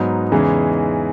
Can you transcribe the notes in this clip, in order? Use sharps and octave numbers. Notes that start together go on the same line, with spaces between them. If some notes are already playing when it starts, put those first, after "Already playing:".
Already playing: G#2 F#3 B3 D#4
E2 C#3 E3 G#3 D#4